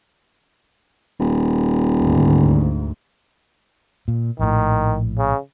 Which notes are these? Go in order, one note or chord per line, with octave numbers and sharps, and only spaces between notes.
D#1
D2 G#2
A#2
A#1 A2 D#3
C#3